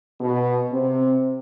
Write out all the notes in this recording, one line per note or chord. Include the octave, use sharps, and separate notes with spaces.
B2 B3
C3 C4